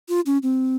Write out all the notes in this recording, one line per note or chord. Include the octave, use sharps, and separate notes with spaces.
F4
C#4
C4